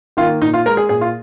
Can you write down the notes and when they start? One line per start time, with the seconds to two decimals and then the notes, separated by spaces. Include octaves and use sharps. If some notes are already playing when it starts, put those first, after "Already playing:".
0.17 D#3 A#3 F4
0.41 A#2 D#4
0.53 F4
0.66 G#3 A#4
0.77 G#4
0.89 A#2 G#4
1.01 F4